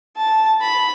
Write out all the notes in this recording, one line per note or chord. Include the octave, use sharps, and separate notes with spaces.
A5
B5